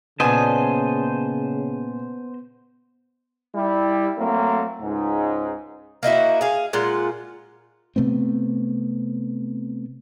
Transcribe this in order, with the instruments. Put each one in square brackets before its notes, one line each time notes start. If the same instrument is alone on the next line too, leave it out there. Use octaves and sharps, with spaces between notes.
[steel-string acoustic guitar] A#2 G#5 [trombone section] C#3 [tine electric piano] B3 [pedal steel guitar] C5 D#5 A5
[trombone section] G3 E4
F#3 A3 A#3 C4
C#2 G#2
[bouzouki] A#3 D#4 E4 F#4
G#4 F5
A#2 G#3 F4 F#5
[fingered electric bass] C3 A3 B3 C4